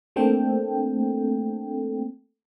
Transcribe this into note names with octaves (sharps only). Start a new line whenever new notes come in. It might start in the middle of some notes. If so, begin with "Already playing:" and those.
A3 A#3 C4 D4 A4 G5